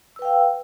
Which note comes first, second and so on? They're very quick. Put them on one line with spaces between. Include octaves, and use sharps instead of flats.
E6 B4 G5 F5